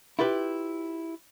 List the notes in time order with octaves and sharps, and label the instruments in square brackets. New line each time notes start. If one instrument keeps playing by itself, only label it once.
[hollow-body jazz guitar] E4 F4 G4 B4 G5